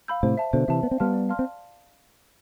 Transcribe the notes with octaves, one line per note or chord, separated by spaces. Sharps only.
F5 B5 E6 G6
A2 C3 C5
E5 A5
B2 D3 C5
C3 E3 E5 A5
B3 D5
C4
G3 B3 F5 A5 C6 F6
D5
F5 A5 C6 F6
C4